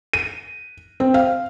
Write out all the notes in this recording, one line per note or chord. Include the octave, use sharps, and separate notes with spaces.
D#7
C4
F5